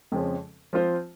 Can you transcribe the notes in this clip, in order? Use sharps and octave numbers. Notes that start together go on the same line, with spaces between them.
F2 C#3 F3 G#3 C#4
F3 C4 F4 C5